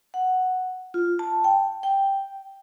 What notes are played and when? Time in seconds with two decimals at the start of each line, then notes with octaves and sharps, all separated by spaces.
0.14 F#5
0.94 F4
1.19 A5
1.44 G5
1.83 G5